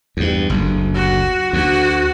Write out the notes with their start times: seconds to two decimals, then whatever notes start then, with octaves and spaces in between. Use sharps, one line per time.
0.17 E2 G2
0.50 F#1 D2
0.95 F#4
1.53 D2 F#4